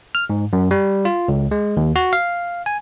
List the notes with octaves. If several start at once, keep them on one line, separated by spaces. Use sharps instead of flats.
F6
G#2
F#2
G3
F4
C#2
G#3
D#2
F#4
F5
G#5